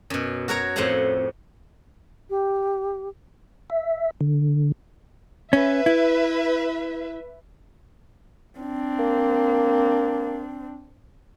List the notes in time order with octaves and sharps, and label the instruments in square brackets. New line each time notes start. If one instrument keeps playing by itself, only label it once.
[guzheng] F#2 B2
F#4 A#4 C#5 A#5
F2 A2 C5 F5 F#5 A#5
[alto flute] G4
[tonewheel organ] E5
D3
[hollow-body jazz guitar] C#4 [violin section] B4 E5
[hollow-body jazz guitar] E4
[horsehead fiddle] C4 D4
[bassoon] A#3